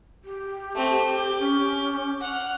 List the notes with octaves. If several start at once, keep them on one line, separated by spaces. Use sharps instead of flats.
G4
A3 C4
G4 D6 G6
C#4
F#5 F6